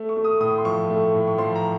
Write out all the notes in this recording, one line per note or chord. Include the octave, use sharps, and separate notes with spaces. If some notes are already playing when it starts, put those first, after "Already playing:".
Already playing: A3
C#6
A3
D#6
A2 D#6
C6
F3 C#6
A3
A2
C#6
F3 C6
A#5